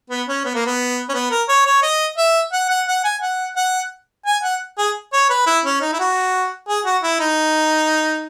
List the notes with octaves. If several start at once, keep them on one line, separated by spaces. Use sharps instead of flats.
B3
C#4
B3
A#3
B3
C#4
B3
A#4
C#5
C#5
D#5
E5
F#5
F#5
F#5
G#5
F#5
F#5
G#5
F#5
G#4
C#5
B4
E4
C#4
D#4
E4
F#4
G#4
F#4
E4
D#4